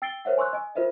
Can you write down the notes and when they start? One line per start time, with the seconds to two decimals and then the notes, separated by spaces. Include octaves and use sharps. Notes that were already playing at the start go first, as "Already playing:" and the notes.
0.02 G5 E6 A6 C7 D7 G7
0.25 A#4 C5 C#5 E5 F#5
0.38 G#5 C6 C#6 E6 F#6
0.53 D#5 G#5
0.75 F4 A#4 C5 D#5 E5